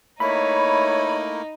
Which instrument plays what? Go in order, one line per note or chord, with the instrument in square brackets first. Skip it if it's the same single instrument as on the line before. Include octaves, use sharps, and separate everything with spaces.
[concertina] A3 A#3 E4 [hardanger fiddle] D#4 [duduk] C#5 [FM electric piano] B5